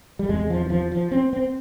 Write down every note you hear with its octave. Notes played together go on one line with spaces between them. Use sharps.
G3
E2 C3 G#3
F3
E3
F3
F3
C4
C4